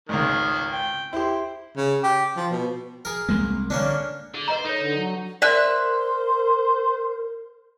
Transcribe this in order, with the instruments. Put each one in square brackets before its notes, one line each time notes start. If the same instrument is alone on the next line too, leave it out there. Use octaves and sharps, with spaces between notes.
[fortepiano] G#1 C#2 [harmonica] D#3 A#3
[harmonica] G5
[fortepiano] E4 G4 [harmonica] C5
[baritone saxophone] C#3
G4
F3
B2
[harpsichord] G#4 A#4
[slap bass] C2 G#3 A#3
[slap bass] D3 [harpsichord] A#3 C#4 D4
[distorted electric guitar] D3 [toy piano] G#4
[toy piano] B4 D#5 A#5 [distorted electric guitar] C5
[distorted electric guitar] D#4 [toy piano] A4 C#5
[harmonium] D3
F#3
[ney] A#4 [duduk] C5 [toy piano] D5 [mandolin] E5 E6 F#6